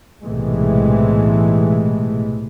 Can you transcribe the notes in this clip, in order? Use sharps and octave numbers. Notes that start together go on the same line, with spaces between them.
B1 A2 C3 E3 G#3 A3